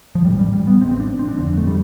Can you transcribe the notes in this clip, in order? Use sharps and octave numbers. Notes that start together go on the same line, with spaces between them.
F3
A1 A2 G3
G3
G3
B3
A1 A2 C4
C4
D4
C4
D4
G1 F2 D3 C4
A3
G3